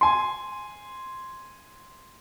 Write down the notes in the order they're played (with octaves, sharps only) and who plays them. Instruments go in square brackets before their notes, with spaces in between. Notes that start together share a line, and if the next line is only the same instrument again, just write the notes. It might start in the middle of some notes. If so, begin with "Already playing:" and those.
[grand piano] G#5 C6